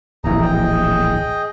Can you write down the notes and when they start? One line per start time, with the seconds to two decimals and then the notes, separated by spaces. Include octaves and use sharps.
0.24 D1 A#1 E3 D#4 G#4 A#5
0.42 G#4 D#5 G5